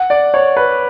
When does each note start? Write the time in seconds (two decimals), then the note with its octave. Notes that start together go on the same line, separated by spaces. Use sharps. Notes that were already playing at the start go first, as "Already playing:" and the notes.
Already playing: F#5
0.10 D5
0.34 C#5
0.57 B4